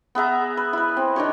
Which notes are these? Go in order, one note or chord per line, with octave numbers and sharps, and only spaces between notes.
B3 G#4 E5 A#5
B4
E4 B4
C4
D#3 D4 G4 C#5